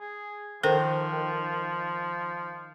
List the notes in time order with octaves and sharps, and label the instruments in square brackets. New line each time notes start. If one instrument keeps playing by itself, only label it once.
[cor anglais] G#4
[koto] D#3 [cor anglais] F3 [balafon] A4 A#4 C5